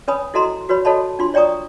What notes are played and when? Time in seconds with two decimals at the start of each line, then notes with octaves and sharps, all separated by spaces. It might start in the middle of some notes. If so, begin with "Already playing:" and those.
0.08 C#4 B4 C#5 G#5 B5 D#6
0.34 E4 F#4 A4 D#5 A#5 C6
0.69 F#4 B4 C#5 B5
0.85 F#4 A4 C#5 D#5 A5 B5
1.19 D4 F4 C6
1.34 C#5 D5 G5 A#5 C#6 D#6